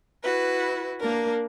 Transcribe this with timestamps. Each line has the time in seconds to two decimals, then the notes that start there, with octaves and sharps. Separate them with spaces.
0.22 E4 F#4 B4
0.99 A#3 D4 A#4